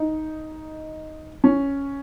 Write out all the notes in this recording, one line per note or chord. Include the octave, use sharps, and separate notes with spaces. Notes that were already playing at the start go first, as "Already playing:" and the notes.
Already playing: D#4
C#4